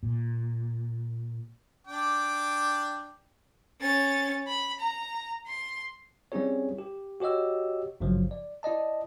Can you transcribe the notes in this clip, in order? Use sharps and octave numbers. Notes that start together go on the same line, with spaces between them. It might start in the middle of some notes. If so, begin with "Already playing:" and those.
A#2
D4 G5 D6
C#4 A6
B5
A#5
C6
G3 C4 C#4 E4 G#4 C#5
G4
F#4 G4 C#5 D#5 E6
G#1 G2 C#3 F3 F#3
D5
E4 D5 D#5 A5